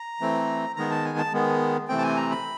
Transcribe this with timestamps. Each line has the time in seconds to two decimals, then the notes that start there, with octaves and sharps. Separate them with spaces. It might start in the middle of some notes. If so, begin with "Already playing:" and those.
Already playing: A#5
0.21 E3 A3 C4
0.76 D#3 G#3 B3 A#5
0.91 A5
1.05 G#5
1.18 A5
1.33 D#3 G#3 B3
1.88 C3 E3 A3 C4 G5
1.98 A5
2.03 G#5
2.17 A#5
2.31 B5